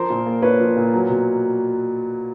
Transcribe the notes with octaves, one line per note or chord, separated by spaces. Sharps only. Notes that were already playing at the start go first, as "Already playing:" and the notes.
Already playing: F3 A#4 C5
A#2
A#3
A#2 B4 C#5
F3
A#2
F#3
B2